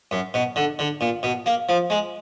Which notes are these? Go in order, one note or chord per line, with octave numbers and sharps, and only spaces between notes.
F#2
B2
D3
D3
A#2
B2
A#3
F3
G#3